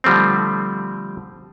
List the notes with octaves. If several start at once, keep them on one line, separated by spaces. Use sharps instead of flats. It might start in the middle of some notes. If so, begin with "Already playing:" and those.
D3 F3 G3 A3 C4